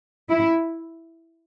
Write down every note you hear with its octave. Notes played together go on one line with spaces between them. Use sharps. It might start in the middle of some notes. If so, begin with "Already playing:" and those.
E4